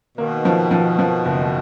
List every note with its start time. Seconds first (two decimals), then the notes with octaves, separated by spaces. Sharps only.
0.18 B2 D#3 A#3
0.45 F3
0.71 F3
0.99 F3
1.25 F#1